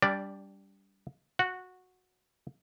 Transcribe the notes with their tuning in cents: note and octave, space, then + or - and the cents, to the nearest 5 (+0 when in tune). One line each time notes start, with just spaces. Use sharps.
G3 +0 D4 -25 D5 +0
F#4 -15 F#5 +0